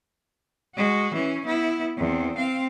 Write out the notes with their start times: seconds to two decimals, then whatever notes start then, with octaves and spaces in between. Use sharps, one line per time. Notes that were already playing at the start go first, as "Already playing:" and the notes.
0.76 G#3 F#4
1.14 E3 C#4
1.46 B3 E4
1.98 E2 C4
2.36 C4 F5